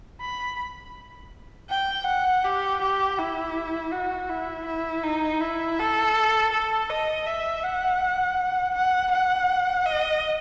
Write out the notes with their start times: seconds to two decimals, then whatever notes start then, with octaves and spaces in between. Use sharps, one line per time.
0.21 B5
1.70 G5
2.07 F#5
2.44 G4
2.82 G4
3.18 E4
3.92 F#4
4.30 E4
4.67 E4
5.03 D#4
5.41 E4
5.79 A4
6.53 A4
6.90 D#5
7.27 E5
7.64 F#5
8.75 F#5
9.12 F#5
9.86 D#5